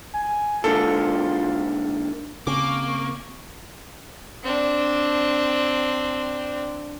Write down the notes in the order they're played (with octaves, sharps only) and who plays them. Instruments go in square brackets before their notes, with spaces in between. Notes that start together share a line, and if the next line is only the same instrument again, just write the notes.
[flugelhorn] G#5
[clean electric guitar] G#2 D3 A#3 [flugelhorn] F4 [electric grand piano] A4
[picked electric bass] C#3 C4 C#4 [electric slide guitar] A#3 [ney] C#6 [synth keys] D6
[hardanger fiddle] C4 D4